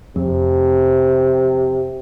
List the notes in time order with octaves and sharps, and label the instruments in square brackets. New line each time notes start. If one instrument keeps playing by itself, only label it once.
[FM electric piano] F2 [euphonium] C3